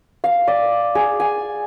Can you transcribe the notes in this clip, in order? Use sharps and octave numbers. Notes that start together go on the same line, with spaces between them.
F5
D5
G#4
G#5